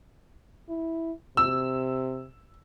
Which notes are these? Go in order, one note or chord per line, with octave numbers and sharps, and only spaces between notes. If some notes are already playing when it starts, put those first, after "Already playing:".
E4
C3 E6